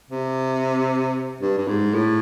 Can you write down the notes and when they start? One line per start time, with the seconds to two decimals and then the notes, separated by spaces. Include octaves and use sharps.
0.10 C3
1.41 G2
1.58 G2
1.68 G#2
1.94 A2